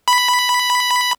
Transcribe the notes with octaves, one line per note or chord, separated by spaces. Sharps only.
B5